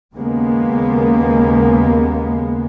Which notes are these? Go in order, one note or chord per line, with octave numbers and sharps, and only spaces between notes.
D#2 C#3 G#3 A#3 B3